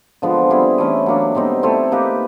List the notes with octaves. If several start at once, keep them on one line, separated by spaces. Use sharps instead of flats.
D3 F3 G#3 B3
G3 C4 E4 G#4
E3 A3 C#4
F#3 A#3 D4
B2 G3 C4 D#4
A3 C4 E4 A4
A#3 D#4 G4 B4